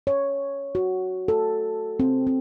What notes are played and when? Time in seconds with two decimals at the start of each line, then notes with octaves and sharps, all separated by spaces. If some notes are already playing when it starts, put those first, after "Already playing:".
0.07 C#5
0.75 F#4
1.28 A4
2.00 C4
2.27 C4